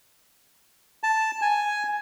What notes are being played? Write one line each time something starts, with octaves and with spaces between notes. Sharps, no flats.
A5
G#5